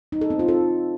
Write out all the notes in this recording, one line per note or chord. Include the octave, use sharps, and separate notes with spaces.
D#4
A4
C4
F4
A4